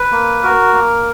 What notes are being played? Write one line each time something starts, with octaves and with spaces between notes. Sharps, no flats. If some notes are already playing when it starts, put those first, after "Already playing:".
Already playing: B4
A#3
F#4 A#4
A#3